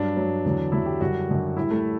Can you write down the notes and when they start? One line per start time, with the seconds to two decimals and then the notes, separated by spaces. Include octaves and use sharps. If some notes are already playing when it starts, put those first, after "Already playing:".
Already playing: G2 F#3 D4
0.17 G2 F#3
0.45 E2 D3 F#3
0.72 E2 D3 F#3 E4
0.86 G4
1.01 F#2 D3 G3 F#4
1.28 F#2 D3 G3
1.57 A2 G3 E4
1.71 A3